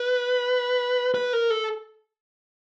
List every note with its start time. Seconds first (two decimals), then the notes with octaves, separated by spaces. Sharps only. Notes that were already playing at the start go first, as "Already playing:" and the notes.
Already playing: B4
1.15 B4
1.33 A#4
1.50 A4